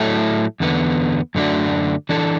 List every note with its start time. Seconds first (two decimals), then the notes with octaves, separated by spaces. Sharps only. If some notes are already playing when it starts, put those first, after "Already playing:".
Already playing: A2 F#3 A3 E4 A4
0.60 E2 D3 B3
1.35 F#2 D3 A3 D4 F#4
2.09 E3 D4 A4